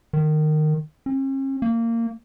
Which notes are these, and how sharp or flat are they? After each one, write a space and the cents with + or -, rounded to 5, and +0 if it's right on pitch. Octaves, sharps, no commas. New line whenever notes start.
D#3 -20
C#4 -45
A#3 -20